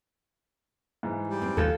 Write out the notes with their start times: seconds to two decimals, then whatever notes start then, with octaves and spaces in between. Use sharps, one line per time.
1.03 G#2 E3
1.28 G3
1.42 C4
1.57 D#2 F4 A4